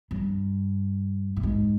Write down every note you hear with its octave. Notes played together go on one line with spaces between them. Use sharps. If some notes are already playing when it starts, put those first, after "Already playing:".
G2
A2
G#2